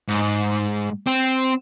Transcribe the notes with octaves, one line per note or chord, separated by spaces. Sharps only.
G#2
C4